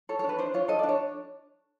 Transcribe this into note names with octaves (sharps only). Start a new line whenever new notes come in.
A4 C#5
C#5
D4
B4
D4 C5
F4 C#5
A4 D#5
D5
D4
C#5